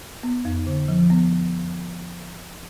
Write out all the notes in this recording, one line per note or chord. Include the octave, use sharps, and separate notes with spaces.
B3
F2
D3
F3
B3